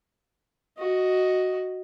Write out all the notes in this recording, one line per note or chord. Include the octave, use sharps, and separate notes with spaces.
F#4 D#5